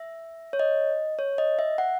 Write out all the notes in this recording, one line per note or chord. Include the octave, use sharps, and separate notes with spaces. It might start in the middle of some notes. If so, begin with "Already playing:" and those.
Already playing: E5
C#5
D#5
C#5
D#5
E5
F#5